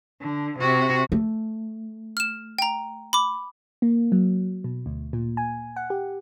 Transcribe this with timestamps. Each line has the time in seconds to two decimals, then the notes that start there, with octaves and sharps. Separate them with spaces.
0.21 D3
0.59 C3 F#4
1.12 A3
2.17 F6 E7
2.59 G5 A#5
3.13 B5 D6
3.82 A#3
4.12 F#3
4.64 B2
4.86 D2
5.13 A#2
5.37 G#5
5.76 F#5
5.90 G4